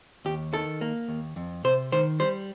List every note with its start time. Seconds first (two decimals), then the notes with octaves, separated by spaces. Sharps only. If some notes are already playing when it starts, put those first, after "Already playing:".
0.25 D#2 G4
0.53 D#3 A4
0.81 A#3
1.08 D#2
1.36 F2
1.64 C3 C5
1.92 D#3 C5
2.20 G3 C5